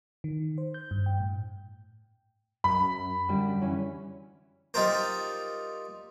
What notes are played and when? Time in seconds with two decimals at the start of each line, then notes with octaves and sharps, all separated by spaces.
0.24 D#3
0.58 C5
0.74 G6
0.91 G2
1.06 G5
1.20 A2
2.64 F#2 B5
3.29 F#2 D3 G3
3.61 E3 C#4 B5
4.74 G3 D#4 F4 A#4 C5